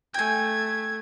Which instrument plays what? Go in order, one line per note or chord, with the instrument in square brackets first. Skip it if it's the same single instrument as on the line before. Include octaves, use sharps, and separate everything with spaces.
[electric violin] A3 G#6 [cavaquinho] G5 G#5